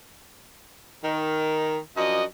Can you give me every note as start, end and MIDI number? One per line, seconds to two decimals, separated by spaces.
1.04 1.79 51
1.04 1.79 70
1.97 2.24 42
1.97 2.24 53
1.97 2.24 62
1.97 2.24 66
1.97 2.24 75